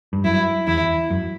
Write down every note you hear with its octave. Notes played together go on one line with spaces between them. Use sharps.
G2
F#2 E4
E2 E4
F#2